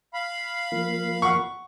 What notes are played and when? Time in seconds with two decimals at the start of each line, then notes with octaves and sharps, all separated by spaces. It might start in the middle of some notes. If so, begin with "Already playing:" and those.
0.14 F5 B5
0.72 F3 A#3
1.22 F#5 C#6